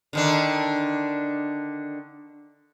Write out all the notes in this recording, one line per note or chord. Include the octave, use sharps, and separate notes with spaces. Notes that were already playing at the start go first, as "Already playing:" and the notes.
D3 D#3 D4